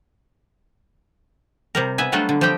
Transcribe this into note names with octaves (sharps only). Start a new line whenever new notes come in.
C3 G3 A#4
B3 B4 E5 G#5
F#3 G3 A3 D4 F4 F#4
D3
F3 G3 C4 G4 G5